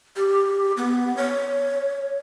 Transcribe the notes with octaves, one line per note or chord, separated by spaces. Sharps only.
G4
B3
C#5